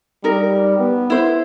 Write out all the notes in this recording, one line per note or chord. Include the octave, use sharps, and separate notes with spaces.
G3 D#4 A#4
B3
E4 C5